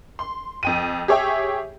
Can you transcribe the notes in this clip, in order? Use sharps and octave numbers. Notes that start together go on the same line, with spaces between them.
C6
F2 G5 D#7
G4 G#4 C#5 E5 G5